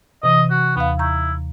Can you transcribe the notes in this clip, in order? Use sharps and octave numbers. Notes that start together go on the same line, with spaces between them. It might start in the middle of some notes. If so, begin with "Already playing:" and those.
C3 E3 D#5
F#4
D#2 B3 F5
E4 A#5 C#6 G6